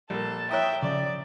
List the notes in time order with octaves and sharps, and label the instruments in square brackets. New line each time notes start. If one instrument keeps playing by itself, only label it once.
[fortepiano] A#1 A#3 [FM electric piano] G3 [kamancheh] A4 A5
[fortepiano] E4 F#6 [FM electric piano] C#5 A#5 D#6 [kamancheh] E5 G5
[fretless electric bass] C#3 F3 [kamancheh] D5